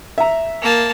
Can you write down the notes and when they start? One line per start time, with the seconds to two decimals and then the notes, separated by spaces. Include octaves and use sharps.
0.18 E5 A#5
0.62 A#3 A5